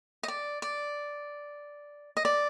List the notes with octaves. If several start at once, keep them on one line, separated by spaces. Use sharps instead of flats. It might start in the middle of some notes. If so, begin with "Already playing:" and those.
D#5
D5
D5
D#5
D5